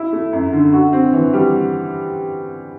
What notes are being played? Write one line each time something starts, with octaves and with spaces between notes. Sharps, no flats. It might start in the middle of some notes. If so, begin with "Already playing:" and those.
Already playing: E4
A3
F#2
D3
F#4
C4
E3
G3